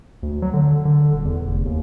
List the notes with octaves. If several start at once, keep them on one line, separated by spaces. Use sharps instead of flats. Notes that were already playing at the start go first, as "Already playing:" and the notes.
D2
F#3
D3
D3
D#1
E2
F1
D#2